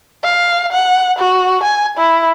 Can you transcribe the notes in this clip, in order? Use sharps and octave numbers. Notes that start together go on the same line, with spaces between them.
F5
F#5
F#4
G#5
E4